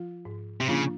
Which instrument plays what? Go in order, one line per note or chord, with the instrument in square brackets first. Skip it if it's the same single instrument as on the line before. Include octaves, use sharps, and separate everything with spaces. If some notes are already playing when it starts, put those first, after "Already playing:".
Already playing: [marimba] F3 F4
G#2
[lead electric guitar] C3
[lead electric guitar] C#3 [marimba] F3 A#3 D4 F4